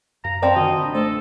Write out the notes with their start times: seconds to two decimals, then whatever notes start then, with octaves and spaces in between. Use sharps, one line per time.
0.24 F#2 F5 A#5
0.42 F3 C4 D5
0.56 D3 D#3 F#4 D#5 F#5 G#5
0.81 A1 D4 B5
0.95 A3 A4 C5